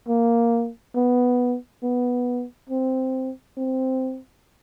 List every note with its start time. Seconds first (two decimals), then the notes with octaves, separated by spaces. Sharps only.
0.08 A#3
0.95 B3
1.83 B3
2.69 C4
3.57 C4